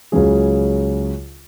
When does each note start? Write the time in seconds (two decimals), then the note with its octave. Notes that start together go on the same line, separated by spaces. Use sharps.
0.12 C#2 C#3 F#3 C#4 G#4